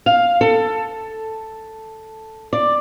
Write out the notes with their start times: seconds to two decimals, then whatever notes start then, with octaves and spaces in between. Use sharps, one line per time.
0.06 F5
0.41 A4
2.53 D5